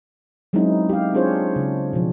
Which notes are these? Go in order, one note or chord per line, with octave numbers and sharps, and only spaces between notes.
F#3 G#3 C4 C#4 D#4 E4
G4 F5
C4 D4 F4 G#4 C5 C#5
C#3 C#4
B2 F3